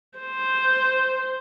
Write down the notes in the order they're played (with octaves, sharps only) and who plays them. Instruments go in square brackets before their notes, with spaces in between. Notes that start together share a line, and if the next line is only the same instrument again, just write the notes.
[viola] C5